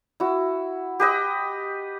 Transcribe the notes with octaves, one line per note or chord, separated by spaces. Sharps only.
E4 F#4
G4 B4 D#5